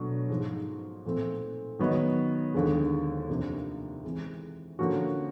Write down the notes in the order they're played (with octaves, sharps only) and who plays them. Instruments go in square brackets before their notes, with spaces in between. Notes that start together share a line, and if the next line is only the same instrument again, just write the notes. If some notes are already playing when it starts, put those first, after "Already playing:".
Already playing: [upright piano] B2 F#3 A3 D4
G#2 F3 G#3
A#2 F3 A3 C4
D#3 F#3 B3 D#4
D#2 D3 F3 G#3
F2 C3 F3 A#3 D4
E3 G#3 C4
D3 F3 A#3 C#4 F#4